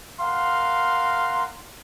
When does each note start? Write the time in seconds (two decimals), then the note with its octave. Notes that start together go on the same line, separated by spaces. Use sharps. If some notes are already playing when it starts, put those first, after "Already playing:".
0.21 A#4 F5 F#5 C6